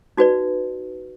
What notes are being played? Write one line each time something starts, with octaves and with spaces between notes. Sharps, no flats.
D#4 F#4 B4 D5